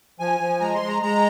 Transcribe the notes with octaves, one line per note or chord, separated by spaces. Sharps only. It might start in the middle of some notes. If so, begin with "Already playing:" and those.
F3 G#5
F3
G#3 A#5
C6
G#3
A#5
G#3 A#5